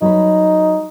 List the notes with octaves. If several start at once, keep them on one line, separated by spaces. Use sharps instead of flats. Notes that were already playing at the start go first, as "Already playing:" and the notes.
F#3 D#4 B4